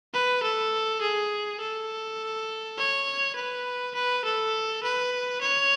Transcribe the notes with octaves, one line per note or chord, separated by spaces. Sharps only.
B4
A4
G#4
A4
C#5
B4
B4
A4
B4
C#5